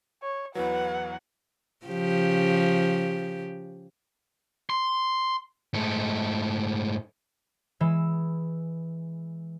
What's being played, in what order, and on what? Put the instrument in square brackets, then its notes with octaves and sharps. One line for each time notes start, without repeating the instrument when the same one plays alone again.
[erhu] C#5
[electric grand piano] E2 E3 F#3 [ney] B4 [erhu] F#5
[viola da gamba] C#3 F3 G4
[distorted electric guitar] C6
G#2 A3
[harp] E3 G#3 E6